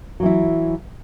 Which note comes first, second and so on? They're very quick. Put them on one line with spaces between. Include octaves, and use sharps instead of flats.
F#3 E3 E4